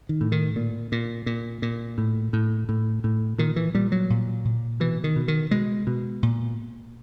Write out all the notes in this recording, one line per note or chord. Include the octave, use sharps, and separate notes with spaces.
D#3
A2
D#3
A#2
A#2
A#2
A#2
A2
A2
A2
A2
A#2 D#3
E3
A#2 G3
F#3
A#2
A#2
B2 E3
D#3
B2
D#3
B2 G#3
B2
A#2